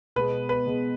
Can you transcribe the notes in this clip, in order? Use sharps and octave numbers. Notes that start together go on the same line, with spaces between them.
B2 G#3 B3 B4
B4
B2 G#3 B3